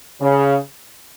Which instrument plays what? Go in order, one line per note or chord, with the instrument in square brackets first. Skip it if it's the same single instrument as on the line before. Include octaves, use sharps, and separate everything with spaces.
[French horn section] C#3